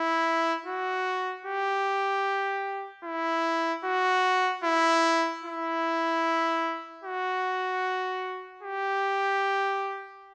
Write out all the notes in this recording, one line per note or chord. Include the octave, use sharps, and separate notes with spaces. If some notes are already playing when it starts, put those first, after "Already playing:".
Already playing: E4
F#4
G4
E4
F#4
E4
E4
F#4
G4